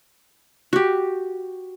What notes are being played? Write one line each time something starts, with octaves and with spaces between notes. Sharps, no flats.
F#4 G4